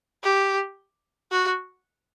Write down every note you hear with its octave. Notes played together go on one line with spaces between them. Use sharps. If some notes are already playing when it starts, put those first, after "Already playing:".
G4
F#4